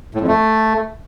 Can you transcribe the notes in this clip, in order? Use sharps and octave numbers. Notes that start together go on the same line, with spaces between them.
A2
F2
A3